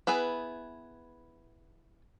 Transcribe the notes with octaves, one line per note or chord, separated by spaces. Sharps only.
B3 E4 G#4 B4